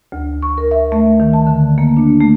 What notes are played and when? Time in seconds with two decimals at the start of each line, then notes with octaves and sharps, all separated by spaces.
0.12 D2
0.43 C#6
0.58 A#4
0.71 E5
0.92 A3
1.20 D#3
1.33 A5
1.47 D3
1.78 A#3
1.97 D4
2.21 A3